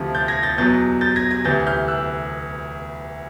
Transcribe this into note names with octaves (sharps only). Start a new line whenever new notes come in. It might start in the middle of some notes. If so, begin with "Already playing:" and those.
Already playing: D2 C3 F3
G6 A6
G#6 A#6
G6 A6
E2 B2 F#3 G6 A6
G6 A6
G#6 A#6
G#6 A#6
D2 C3 E3 G6 A6
F6 G6
E6 F#6